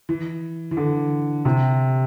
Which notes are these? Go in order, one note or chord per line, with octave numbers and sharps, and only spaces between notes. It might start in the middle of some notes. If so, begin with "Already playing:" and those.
E3
E3
D3
C3